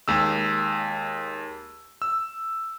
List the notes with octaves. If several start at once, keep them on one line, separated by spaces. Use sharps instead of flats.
D#2 G#3 E6
E6